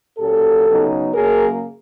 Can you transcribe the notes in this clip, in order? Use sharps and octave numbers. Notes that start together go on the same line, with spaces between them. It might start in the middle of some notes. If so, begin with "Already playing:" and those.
A#2 F#3 A#3 C#4 G4 A4
C#3 F#3 B3 D#4
F#2 C#3 F#3 A#3 G#4 A#4